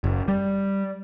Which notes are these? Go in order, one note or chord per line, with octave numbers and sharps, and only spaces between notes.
F#1
G3